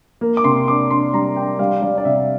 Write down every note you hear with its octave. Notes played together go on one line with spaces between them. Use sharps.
A#3
D6
C3 C6
D4 D6
D4 C6
G3 A#5
D4 G5
G3 F5
G3 D5
D5
C3 E5